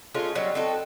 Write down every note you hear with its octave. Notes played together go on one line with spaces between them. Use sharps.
G#3 A3 C#4 F4
F#3 G3 B3 D#4
C4 D#4 F#4 A4